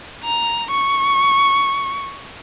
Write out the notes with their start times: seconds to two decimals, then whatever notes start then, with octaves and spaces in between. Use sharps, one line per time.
0.24 A#5
0.71 C#6